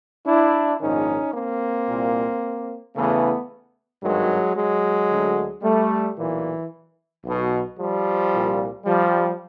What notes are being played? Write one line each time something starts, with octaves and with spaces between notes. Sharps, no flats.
D4 E4
A#1 G#2 D#3 C#4 D#4
A#3 C4
C2 A#2
E2 C#3 E3 A3 B3
G#1 G2 D#3 F#3 G#3
F#3 G#3
D2 D3
G3 A3
B1 A#2 E3
B1 B2
F3 G3
C2 A#2
F3 G3